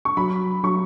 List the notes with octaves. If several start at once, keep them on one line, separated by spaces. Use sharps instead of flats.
C#6
F#3 B5
F#3 C#6